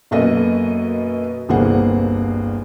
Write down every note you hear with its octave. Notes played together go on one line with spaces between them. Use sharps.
F#2 B2 A#3 A4 B4 D#5
G1 C2 A#3 G#4 C5 F#5